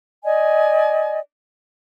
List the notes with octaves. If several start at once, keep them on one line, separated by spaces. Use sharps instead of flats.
D5 D#5 G#5